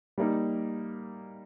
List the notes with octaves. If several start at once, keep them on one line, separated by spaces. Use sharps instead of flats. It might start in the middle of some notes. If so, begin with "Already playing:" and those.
G3 A#3 D#4